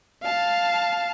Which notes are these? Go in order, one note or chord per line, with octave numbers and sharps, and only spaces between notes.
F5 A5